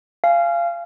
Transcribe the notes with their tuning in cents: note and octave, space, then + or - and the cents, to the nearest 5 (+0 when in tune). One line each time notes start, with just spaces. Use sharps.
F5 -20 G#5 +0